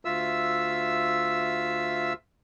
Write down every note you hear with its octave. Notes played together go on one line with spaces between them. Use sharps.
D2 F4 E5 E6